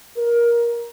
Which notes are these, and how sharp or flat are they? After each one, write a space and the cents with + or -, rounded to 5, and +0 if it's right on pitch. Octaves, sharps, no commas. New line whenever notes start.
A#4 +15